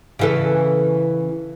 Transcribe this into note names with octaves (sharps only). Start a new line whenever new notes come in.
C#3 E3 A4